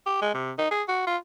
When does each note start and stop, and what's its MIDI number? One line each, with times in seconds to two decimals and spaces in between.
0.06 0.21 67
0.21 0.31 56
0.34 0.51 48
0.58 0.70 63
0.71 0.82 68
0.88 1.04 66
1.07 1.17 65